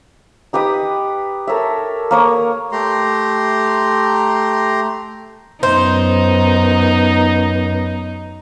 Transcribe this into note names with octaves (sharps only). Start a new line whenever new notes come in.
D#4 G4 B4 D#6
A4 A#4 C#5 E5
A#3 C#5 D#6
A3 G4 A#5 C6
F#2 B3 D#4 C5